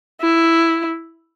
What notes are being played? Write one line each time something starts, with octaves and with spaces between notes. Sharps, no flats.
E4